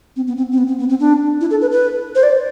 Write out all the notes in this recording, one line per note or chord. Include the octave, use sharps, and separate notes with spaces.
C4
B3
C4
C4
B3
C4
B3
C4
D4
E4
A4
B4
B4
C5
D5